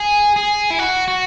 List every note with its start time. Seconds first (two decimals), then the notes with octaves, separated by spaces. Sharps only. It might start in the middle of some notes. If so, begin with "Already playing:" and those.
Already playing: G#4
0.36 G#4
0.70 E4
0.79 F#4
1.08 F#4